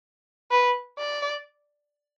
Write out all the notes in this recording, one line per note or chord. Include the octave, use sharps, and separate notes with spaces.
B4
D5